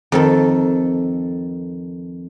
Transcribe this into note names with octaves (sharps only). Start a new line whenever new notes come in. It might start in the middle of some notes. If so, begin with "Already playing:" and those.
F2 D#3 A4